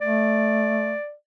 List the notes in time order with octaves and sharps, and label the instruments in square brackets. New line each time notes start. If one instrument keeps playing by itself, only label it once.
[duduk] A3 [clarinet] D5